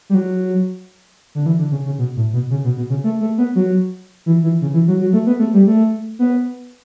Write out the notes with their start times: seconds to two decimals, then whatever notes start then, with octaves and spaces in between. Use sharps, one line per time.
0.10 G3
0.15 F#3
1.35 D3
1.46 E3
1.59 D3
1.71 C#3
1.86 C#3
1.99 B2
2.16 A2
2.33 B2
2.50 C#3
2.64 B2
2.77 B2
2.90 C#3
3.04 A3
3.21 A3
3.38 B3
3.55 F#3
4.26 E3
4.43 E3
4.61 C#3
4.74 E3
4.88 F#3
5.01 F#3
5.13 A3
5.27 B3
5.39 A3
5.54 G3
5.67 A3
6.19 B3